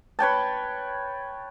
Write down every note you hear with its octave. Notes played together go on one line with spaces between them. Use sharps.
B4 C#5 G5 A5